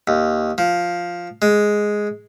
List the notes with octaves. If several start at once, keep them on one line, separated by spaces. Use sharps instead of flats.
D#2
F3
G#3